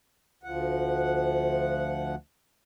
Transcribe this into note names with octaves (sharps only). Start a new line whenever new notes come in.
D2 F3 F#5